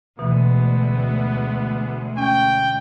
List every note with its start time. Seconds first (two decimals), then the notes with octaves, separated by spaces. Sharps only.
0.19 D2 B2 E3 G#3 B3
2.17 C#4 G5